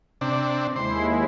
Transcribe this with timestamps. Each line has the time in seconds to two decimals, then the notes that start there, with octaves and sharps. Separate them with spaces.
0.21 C3 D4
0.76 D#2 G#3 E4 C5